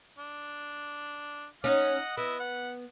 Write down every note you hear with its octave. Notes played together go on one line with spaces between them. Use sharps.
D4
C#4 D#4 D#5 F#5
B3 E4 D#5
F#5